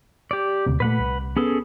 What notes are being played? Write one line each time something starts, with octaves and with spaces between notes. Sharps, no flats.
G4 D5
D#1 D2 C3
A#2 G3 A3 B4 F#5 B5
C2
B3 C#4 G#4 A4